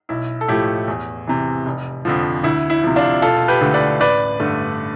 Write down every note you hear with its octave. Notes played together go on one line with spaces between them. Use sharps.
B1 E4
A4
A2 F3 A3 E4 G4
E2
C3 E3
F1
F2 D3 F3
D2 E4
E4
C3 F3
D4 F4
E1 F4 A4
G4 B4
D2 D3 A3
B4 D5
A1 B4 D5
G2 D3 A3